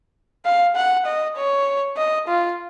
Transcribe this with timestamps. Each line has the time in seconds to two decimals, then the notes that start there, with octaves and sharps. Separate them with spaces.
0.45 F5
0.76 F#5
1.06 D#5
1.37 C#5
1.97 D#5
2.28 F4